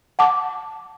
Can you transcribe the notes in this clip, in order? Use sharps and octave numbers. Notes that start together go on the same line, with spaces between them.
F#5 A5 D6